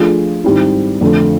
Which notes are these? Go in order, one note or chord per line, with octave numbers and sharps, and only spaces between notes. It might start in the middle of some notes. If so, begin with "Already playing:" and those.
Already playing: F3 A3 D4 F4 G#4
G#2 D#3 G3 C4 E4
F2 D3 F3 A3